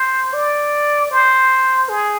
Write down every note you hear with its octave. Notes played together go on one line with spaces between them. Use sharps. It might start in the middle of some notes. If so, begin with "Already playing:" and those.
Already playing: C5
D5
C5
G#4